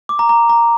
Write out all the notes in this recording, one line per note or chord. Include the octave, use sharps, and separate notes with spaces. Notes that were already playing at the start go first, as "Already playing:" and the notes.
D6
A#5
A#5
A#5